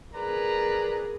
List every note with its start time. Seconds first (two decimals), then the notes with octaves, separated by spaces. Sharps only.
0.14 G#4 A#4 B4 D5 A#5